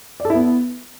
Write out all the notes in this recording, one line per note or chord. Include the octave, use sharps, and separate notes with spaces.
D5
A4
E4
B3